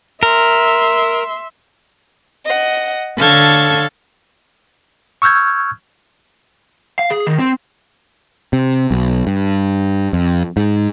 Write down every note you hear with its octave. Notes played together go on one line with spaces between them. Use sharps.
A#4 E5 C6
D#5 F#5
D3 A4 C#5 F5 A5 G#6
C#6 E6 F6 G6 G#6
F5
G#4
D#3
C4
C3
B1
G2
F2
G#2